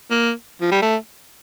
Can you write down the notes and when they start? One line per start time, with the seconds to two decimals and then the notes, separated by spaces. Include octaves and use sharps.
0.10 A#3
0.61 F3
0.71 G3
0.82 A3